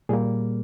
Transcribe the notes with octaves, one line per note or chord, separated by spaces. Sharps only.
A#2 G3 A#3 G#4